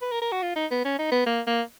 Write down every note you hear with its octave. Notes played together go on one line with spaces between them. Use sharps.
B4
A#4
A#4
F#4
F4
D#4
B3
C#4
D#4
B3
A#3
A#3